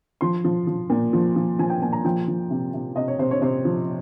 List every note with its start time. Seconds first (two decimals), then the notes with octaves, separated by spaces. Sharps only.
0.21 F3 C6
0.44 F3
0.67 F3
0.90 A#2
1.13 F3
1.36 F3
1.59 F3 G#5
1.70 G5
1.82 A#2 G#5
1.93 A#5
2.05 F3 G5
2.28 F3
2.50 C3
2.74 C3
2.96 C3 D#5
3.08 C#5
3.19 C3 C5
3.31 C#5
3.41 C3 C5
3.65 F3